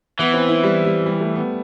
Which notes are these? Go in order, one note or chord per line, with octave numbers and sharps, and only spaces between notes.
E3 B3
C4
E4
G3
G3
G3
A3
B3